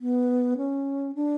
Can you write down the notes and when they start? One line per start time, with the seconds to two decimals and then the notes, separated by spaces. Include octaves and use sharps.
0.01 B3
0.57 C#4
1.15 D4